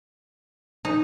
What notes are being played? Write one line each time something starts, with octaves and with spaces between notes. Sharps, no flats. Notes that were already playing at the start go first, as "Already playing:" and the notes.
D#4